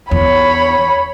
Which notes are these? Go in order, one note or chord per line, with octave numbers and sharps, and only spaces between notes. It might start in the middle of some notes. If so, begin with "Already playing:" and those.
E2 C#5 B5